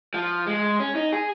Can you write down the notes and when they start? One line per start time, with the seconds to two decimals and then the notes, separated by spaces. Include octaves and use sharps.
0.14 F3
0.47 G#3
0.80 C#4
0.96 D#4
1.13 G#4